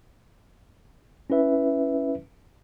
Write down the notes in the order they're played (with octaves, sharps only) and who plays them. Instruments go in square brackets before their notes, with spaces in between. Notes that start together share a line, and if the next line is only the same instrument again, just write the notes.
[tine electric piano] C#4 E4 B4 E5